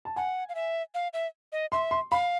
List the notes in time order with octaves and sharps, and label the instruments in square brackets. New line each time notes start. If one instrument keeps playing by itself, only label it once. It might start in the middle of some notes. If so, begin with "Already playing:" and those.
[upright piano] A5
[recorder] F#5 [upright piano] G#5
[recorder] F5
E5
F5
E5
D#5
[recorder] E5 [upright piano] C6
[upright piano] C6
[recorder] F5 [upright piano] B5